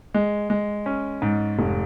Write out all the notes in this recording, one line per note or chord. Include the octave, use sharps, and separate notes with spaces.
G#3
G#3
C#4
G#2
F1